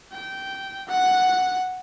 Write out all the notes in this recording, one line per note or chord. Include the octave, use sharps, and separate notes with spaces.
G5
F#5